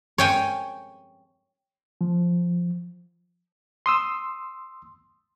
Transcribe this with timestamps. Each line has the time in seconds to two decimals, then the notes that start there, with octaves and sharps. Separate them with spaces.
0.18 C#5 G5 G#5
2.01 F3
3.86 C6 D#6 E6